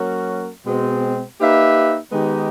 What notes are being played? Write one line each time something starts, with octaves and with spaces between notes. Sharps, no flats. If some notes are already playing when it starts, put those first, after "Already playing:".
Already playing: F#3 A#3 C#4 F#4 A#4
B2 G#3 C4
A#3 D#4 G4 B4 E5
D#3 G#3 B3 D#4 G4